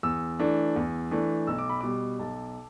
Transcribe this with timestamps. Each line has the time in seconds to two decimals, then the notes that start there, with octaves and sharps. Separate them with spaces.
0.03 E2 E6
0.39 E3 A3 D4
0.76 E2
1.11 E3 A3 D4
1.47 B1 E6
1.58 D6
1.69 B5
1.81 B2 G3 D6
2.19 B1 A5